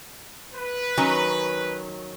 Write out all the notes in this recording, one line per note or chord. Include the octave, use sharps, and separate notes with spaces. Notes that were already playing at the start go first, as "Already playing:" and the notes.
B4
D#3 F#3 C#4